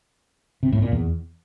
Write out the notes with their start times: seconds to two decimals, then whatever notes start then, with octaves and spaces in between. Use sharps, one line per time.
0.63 C3
0.72 A2
0.82 A#2
0.92 E2